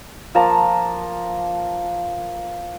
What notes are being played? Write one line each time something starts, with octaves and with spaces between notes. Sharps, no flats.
F3 A#3 A5 A#5